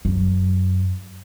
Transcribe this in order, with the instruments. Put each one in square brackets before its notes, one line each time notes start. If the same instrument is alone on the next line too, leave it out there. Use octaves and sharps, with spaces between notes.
[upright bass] F#2